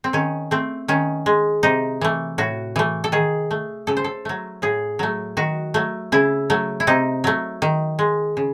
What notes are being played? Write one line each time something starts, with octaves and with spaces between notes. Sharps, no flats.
C4
D#3 C#4
A3 C4
D#3 C#4
G#3
C3 D#4
E3 A3
A2 F#4
E3 A3
A4
D#3 G#4
A3
C#3 A4
C5
A4
F#3 A3
A2 G#4
F#3 A3
D#3 F#4
F#3 A3
C#3 E4
F#3 A3
E4
C3 D#4
F#3 A3
D#3
G#3
C#3